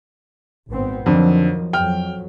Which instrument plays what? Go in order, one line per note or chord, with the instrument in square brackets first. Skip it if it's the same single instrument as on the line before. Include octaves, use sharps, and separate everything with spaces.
[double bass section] G#1 B3 C4
[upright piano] F2 D3 [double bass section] D#3 F3 F#3
[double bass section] F2 F#3 [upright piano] G5 F6